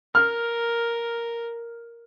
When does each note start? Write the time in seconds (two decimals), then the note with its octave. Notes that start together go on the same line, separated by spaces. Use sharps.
0.15 A#4 F6